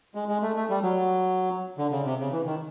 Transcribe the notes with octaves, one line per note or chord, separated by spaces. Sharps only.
G#3
G#3
A3
A3
G3
F#3
D3
C#3
C3
C#3
E3
D#3